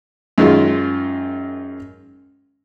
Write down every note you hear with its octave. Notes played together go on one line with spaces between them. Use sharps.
F#2 D#3 G#3 F4